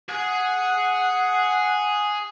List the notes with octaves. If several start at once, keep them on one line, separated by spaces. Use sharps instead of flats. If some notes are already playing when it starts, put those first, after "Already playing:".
G#4 F#5 G#5